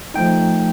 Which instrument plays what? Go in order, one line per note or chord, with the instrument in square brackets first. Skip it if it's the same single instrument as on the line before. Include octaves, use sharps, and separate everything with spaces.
[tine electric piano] F3 A3 D#4 G5